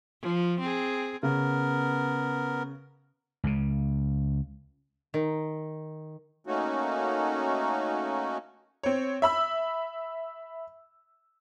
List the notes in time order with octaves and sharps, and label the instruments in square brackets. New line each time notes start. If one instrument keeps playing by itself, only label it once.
[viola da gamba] F3
C4 G#4
[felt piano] C#3 [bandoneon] B3 A#4
[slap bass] C#2 C#3
[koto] D#3
[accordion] A3 A#3 C#4 D#4 F#4
[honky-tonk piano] C4 C#5
E5 B5 E6